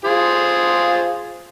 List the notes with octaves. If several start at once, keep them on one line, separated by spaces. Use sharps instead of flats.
F4 G#4 C5